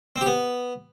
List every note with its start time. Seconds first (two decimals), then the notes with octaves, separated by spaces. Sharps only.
0.16 C4
0.21 G4
0.26 B3